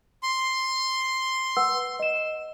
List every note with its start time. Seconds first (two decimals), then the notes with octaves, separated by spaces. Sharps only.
0.23 C6
1.57 B4 F#5 E6
1.99 D#5 E7